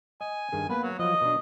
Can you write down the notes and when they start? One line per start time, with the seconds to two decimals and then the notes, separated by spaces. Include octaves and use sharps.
0.21 D#5 G#5
0.52 G2 D#3 G#4
0.70 A#3 B3 B4
0.83 F#3
0.99 F3 F#3 D#5
1.22 B2 D4